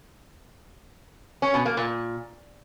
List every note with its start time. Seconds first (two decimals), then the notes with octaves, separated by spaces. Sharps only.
1.42 C#4
1.54 B2
1.66 A#3
1.77 A#2